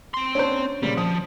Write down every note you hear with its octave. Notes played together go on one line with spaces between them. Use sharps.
C4 C6
C#4 D4 C5
A#2 C#3 G3
F3 D#6